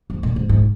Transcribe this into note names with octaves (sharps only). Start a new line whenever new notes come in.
F2
A#2
G#2
G#2